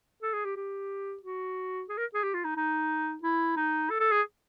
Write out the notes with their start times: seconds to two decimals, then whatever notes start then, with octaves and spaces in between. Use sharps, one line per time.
0.23 A4
0.34 G#4
0.45 G4
0.56 G4
1.23 F#4
1.89 G#4
1.98 A#4
2.15 G#4
2.23 G4
2.34 F4
2.45 D#4
2.56 D#4
3.23 E4
3.57 D#4
3.90 A4
4.00 A4
4.12 G#4